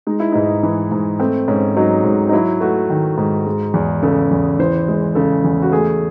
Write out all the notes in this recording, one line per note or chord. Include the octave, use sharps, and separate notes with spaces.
G#3 D#4
E4
G#2 D#4
E3
G#2
A3 C4
G#2 C#4
F#3 D#4
G#2
D#4
F#3 E4
A3 F#4
D#3
G#2
G#3
E2
C#3 A4
E2
E3 C5
G#3
C#3 A4
E2
F#4
A3 G#4